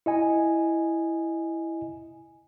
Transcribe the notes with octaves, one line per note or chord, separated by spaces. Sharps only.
E4 D#5 G#5